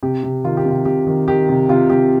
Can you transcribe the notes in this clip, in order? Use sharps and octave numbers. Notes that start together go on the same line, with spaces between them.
C3 G4
C3
D#3 F4
G4
C3
F4
C3 G4
D#3
D#3 G4
C3
C3 F4
C3 G4